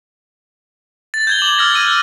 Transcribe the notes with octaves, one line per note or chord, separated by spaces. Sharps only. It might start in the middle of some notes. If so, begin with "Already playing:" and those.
A6
G6 G#6 G7
D6 F#7
E6 F6 G#6 A#6
E6 D#7 G7
F#6